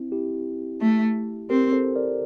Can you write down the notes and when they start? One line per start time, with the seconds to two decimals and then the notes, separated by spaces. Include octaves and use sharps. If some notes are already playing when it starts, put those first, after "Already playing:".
Already playing: C4 E4
0.12 E4 G4
0.81 A3
1.49 C4 G4 A#4
1.73 A4 C5
1.96 A#4 D5